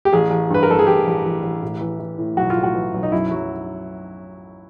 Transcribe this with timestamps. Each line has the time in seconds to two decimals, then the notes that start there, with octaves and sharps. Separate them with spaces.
0.05 G4
0.13 A1 G#4
0.30 A1
0.50 G2 B4
0.63 A#4
0.69 A1 A4
0.79 G#4
0.87 A1 G4
1.07 A1
1.25 A1
1.43 A1
1.63 A2
1.81 E3
1.99 E3
2.19 A2
2.37 B1 F#4
2.50 F4
2.57 A2
2.63 F#4
2.75 E3
2.94 B1
3.03 D#4
3.12 F#2 E4
3.31 F#3